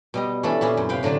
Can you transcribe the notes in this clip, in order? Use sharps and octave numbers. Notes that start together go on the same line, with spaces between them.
B2 G3 D#5
E3 A3 C#4 D4 A4
A#2 B3 C#4 E4 C6
F#2
C3 B4 F5 G5
A2 D3 F#3 A3 D4